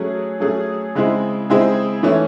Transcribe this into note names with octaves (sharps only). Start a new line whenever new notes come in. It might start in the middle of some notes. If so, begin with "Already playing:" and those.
Already playing: F#3 A3 C#4 G#4
F#3 A3 C#4 G#4
C#3 G#3 C4 E4 G#4
C#3 G#3 C4 E4 G#4
E3 A3 C#4 E4